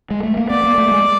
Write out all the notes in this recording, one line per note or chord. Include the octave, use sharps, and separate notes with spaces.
G#3
A3
A#3
B3 D5
A#3
A3
G#3